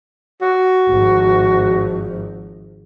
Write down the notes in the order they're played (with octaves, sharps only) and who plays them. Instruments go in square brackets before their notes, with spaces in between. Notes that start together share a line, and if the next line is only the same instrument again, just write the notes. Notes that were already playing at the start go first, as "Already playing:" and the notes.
[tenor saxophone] F#4
[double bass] G#1 F3